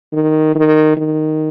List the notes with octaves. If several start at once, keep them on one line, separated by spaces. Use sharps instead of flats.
D#3
D#3
D#3